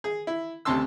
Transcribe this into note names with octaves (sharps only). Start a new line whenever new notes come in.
G#4
E4
D2 C3 C#4 A5 C6 E6